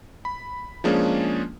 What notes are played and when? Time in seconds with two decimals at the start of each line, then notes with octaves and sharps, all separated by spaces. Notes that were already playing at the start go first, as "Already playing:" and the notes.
0.25 B5
0.84 F3 G#3 A#3 C#4 D4 G#4